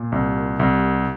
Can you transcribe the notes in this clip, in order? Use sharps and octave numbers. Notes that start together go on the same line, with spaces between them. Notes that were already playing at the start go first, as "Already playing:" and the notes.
Already playing: A#2
C2
C2